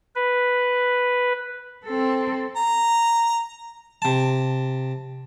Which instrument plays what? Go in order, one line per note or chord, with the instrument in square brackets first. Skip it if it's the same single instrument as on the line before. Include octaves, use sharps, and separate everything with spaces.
[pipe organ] B4
[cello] C4 A4
[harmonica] A#5
[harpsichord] C3 A5